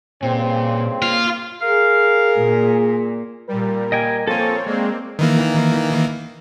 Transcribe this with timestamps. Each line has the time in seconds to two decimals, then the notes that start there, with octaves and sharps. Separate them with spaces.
0.23 G2 A#2 C#3 C4
1.02 A#3 F4
1.62 G#4 A#4 F5
2.37 A#2
3.48 A#2 G3 A#4
3.92 D#5 G5 G#5
4.27 F3 A#3 C4 A4 C#5 G#5
4.66 G#3 A#3 C4 D5
5.19 D#3 E3 A#3